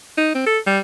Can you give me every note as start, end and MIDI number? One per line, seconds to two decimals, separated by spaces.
0.18 0.33 63
0.35 0.46 60
0.46 0.59 69
0.67 0.80 55